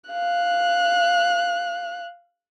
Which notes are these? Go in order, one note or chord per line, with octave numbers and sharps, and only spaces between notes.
F5 F#6